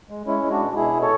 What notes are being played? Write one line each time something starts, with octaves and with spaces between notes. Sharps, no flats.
G#3
G#3 C#4 E4
G#3
D4 F#4
B2
B2 E4 G#4
B2
A4 C#5